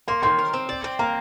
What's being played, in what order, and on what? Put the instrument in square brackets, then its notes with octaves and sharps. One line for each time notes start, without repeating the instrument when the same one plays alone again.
[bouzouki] A#3 [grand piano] C6
[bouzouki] D#3 [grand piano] C6
[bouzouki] A#4
C4
D5
C4
[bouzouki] A#3 [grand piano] A#5